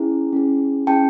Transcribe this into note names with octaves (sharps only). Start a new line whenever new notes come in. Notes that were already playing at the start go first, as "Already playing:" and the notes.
Already playing: C#4 E4 G#4
C#4 E4 G#4
C#4 E4 G#4 G5 A5